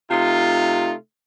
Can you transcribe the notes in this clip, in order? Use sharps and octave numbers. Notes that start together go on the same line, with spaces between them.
C3 A3 D#4 F4